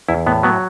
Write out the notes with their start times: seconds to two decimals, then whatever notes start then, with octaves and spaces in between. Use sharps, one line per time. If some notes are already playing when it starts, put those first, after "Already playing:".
0.09 E2 E4
0.26 A2 B3
0.43 F#3 B3